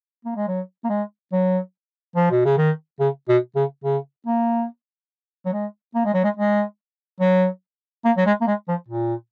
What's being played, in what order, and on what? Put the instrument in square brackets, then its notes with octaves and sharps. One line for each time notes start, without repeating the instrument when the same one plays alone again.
[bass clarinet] A#3
G#3
F#3
A#3
G#3
F#3
F3
B2
C#3
D#3
C#3
B2
C#3
C#3
A#3
F#3
G#3
A#3
G#3
F#3
G#3
G#3
F#3
A#3
F#3
G#3
A#3
G#3
F3
A#2